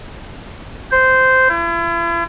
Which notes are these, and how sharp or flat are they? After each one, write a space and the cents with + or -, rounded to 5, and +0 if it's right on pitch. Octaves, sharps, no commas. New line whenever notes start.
C5 -10
E4 +40